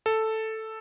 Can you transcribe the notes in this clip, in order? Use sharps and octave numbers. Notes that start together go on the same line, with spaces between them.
A4